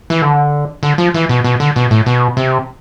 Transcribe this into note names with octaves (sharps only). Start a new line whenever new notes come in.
E3
D3
D3
F3
E3
B2
B2
D3
B2
A2
B2
C3